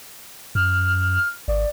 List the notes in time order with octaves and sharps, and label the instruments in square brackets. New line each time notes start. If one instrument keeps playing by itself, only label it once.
[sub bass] F#2 [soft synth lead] F6
[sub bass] G#1 [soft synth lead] D5